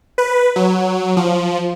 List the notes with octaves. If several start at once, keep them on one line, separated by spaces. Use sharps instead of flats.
B4
F#3
F3